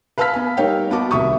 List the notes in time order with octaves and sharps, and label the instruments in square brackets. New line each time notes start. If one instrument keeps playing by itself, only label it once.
[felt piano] B4 F5 A5 E6 F6 B6
B3 G#5
G3 A#3 D#4 C#5 F5 G5
B3 D#4 F#4 A5 D6
D#1 C2 E5 C#6 D#6